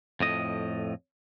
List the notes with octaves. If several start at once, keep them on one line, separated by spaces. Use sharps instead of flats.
F2 A2 D#5